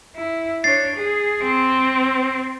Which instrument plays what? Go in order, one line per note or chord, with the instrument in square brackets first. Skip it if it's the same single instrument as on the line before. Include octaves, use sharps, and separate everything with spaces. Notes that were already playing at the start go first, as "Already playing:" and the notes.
[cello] E4
[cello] D4 C#5 [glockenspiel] A6 C7
[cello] G#4
C4